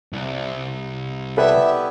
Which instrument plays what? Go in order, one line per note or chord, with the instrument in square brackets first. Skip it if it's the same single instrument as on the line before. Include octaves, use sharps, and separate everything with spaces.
[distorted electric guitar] C2
[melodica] B3 E4 G4 [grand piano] A4 B4 D5 [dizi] E5